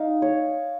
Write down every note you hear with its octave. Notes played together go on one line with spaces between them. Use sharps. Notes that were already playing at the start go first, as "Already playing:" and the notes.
Already playing: D#4 F5
C#5